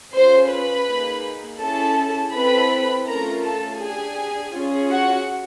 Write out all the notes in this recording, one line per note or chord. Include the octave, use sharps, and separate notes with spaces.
C#4 F4 G#4 C5 C6
B4 B5
A#3 D#4 G#4
C#4 E4 G#4 A4 A5
C4 E4 A4 B4 B5
A3 C#4 F4 A4 A#4 A#5
A4 A5
D4 G4 G#4 G#5
C#4 F4 G#4
F#4 F#5